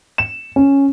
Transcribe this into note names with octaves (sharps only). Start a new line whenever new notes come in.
E7
C#4